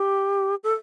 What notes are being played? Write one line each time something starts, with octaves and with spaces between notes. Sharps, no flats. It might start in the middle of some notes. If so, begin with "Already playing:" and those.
Already playing: G4
A4